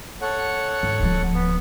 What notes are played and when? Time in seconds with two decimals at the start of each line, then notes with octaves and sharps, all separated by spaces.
0.22 A4 C#5 F#5
0.83 G#2
1.00 D1 F3
1.34 B3